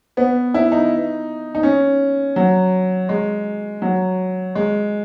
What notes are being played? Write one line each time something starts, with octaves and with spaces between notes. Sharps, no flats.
B3
E4
D#4
D#4
C#4
F#3
G#3
F#3
G#3